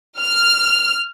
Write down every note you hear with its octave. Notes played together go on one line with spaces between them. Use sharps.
F6